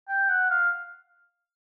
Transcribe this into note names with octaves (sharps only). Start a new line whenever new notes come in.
G5
F#5
F5